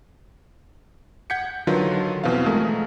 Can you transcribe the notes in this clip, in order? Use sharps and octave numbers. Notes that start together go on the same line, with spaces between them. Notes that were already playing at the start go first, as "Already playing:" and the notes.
F#5 G6 G#6 B6 C#7
D3 D#3 F#3 F4 B4
F2 B2 E3 C4 F5
G#3 A3 G#4 A#4